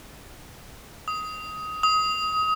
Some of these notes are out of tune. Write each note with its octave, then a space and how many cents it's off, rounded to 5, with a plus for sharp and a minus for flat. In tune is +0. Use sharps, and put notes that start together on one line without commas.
D#6 +15
D#6 +25